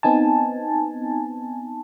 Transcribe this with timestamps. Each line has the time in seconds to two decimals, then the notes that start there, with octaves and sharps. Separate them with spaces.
0.03 B3 C4 D#4 G#5 A5